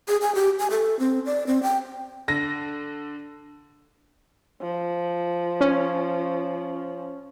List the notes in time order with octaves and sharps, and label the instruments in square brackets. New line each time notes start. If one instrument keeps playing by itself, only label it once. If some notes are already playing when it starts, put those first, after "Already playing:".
[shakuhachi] G#4
G#5
G4
G#5
A4
C4
D5
C4
G5
[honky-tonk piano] D3 A#6
[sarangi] F3
[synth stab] C#4